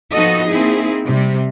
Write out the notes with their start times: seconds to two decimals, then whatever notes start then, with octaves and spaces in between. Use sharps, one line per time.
0.13 F3 B3 D#4 F#4 A4 D#5
0.49 A#3 C4 D#4 E4 G#4
1.07 C3 G3